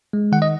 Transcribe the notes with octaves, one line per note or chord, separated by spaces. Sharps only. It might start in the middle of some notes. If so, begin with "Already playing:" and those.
G#3
D#3 F#5
D#5